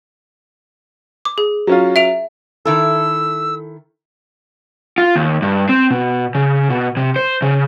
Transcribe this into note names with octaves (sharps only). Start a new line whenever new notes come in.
D6
G#4
F#3 C#4 F4
E5 D7 F7
D#3 E4 A4 E6
F4
D#2
G2
C4
B2
C#3
B2
C3
C5
C#3